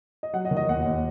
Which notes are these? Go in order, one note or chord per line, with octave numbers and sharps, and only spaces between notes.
D#5
F#3 F#5
D#5
D#3
D#5
D#2 F#5
D#2